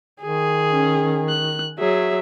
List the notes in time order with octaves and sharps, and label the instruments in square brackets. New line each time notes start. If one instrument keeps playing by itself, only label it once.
[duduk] D#3 [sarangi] G#4
[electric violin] C#4
F#6
[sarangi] F#3 [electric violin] G#4 E5